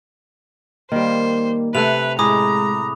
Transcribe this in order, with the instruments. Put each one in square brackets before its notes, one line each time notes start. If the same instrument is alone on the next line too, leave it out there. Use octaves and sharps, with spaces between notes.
[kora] D#3 G3 [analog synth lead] A#3 [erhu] C5
[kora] C3 A3 [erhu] B4 [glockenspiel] F#6 F7
[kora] A2 G#4 [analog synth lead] G#3 [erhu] A#5 [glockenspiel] B5 D6 D#6